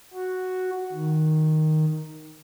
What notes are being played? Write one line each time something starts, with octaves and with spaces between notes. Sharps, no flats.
F#4
D#3